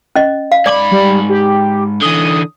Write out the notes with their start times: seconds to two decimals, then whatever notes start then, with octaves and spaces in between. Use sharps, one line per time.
0.15 C#4 D#5
0.52 F5
0.66 G#2 D5 B5 D6
0.91 G3
1.29 G4
2.02 D3 E3 D#6